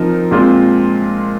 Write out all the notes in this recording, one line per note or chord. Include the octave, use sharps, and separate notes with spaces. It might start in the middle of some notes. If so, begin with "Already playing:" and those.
Already playing: F3 C4 D#4 A#4
A#2 G#3 C4 F4